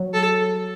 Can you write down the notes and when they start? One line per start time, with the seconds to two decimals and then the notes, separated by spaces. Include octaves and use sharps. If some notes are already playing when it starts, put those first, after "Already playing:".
Already playing: F#3
0.14 A4